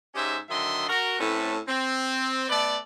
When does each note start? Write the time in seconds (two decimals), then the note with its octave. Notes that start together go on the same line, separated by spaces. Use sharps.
0.14 G#2 C#4 G4 C5 D#5 E5
0.49 D3 D#3 F#3 D#5 E5 C6
0.88 F#4 A#4
1.19 A2 A3 C4 C#4 B4 A5
1.68 C4
2.49 A3 B3 B4 D5